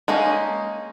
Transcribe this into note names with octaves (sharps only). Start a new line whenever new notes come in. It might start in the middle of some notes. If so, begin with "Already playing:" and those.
G#3 A#3 C#4 D#4